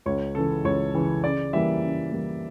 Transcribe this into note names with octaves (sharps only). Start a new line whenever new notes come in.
C#2 C#5
C#3 E3 A4
C#2 C#5
C#3 E3
C#3 D5
E3 G3 A#3 E5
C#3
E3 G3 A#3